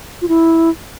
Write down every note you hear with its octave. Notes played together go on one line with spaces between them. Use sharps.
F4
E4